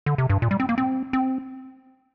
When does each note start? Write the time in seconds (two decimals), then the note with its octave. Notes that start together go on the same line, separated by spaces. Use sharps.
0.06 D3
0.18 C3
0.30 G2
0.42 A#2
0.51 G3
0.60 C4
0.69 A#3
0.78 C4
1.13 C4